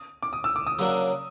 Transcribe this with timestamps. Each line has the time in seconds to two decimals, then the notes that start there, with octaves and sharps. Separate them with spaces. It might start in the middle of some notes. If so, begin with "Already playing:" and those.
Already playing: D#6
0.23 D6
0.33 D#6
0.44 E6
0.56 D6
0.66 D#6
0.79 C#3 F#3 A#3 D4 F#4